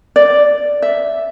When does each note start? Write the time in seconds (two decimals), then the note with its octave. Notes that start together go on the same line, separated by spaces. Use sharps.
0.16 D5
0.82 E5